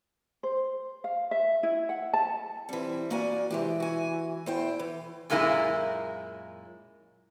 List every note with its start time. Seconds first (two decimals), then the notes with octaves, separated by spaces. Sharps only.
0.43 C5
1.04 F5
1.31 E5
1.63 E4
1.89 F#5
2.13 A5
2.69 E3 G3 C4
3.11 A#3 F#4 D5 G#5
3.51 C3 E3 G#3 G4
3.80 F#4 G#5
4.46 E2 E4 C5 G5
4.79 E3
5.30 F#2 A#2 G#3 A#3 E4